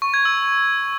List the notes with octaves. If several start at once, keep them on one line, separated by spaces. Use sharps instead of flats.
C#6
G#6
E6